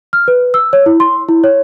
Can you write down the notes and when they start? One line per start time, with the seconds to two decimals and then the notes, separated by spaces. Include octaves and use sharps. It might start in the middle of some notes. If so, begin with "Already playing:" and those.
0.13 F6
0.28 B4
0.54 E6
0.73 C#5
0.86 E4
1.00 C6
1.29 E4
1.44 C#5